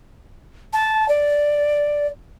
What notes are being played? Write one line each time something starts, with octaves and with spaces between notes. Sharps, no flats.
A5
D5